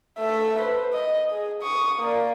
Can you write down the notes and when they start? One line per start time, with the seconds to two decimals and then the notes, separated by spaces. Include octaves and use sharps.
0.19 A3 E5
0.59 B4 C5
0.93 D#5
1.31 G#4
1.63 C#6 D#6
1.99 A#3 D5